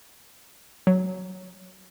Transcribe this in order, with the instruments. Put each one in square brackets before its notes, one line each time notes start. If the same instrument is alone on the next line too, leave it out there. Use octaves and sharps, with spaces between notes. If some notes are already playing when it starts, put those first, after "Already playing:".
[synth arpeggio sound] F#3